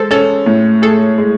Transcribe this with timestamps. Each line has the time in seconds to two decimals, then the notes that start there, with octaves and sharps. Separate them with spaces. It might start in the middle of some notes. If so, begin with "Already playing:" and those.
Already playing: G#3 A4 C5
0.11 C#4 A4
0.46 A2
0.82 G#4 A4
1.18 G#3